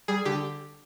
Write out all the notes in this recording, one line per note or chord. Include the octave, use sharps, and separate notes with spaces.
G3 G#4
D3 G4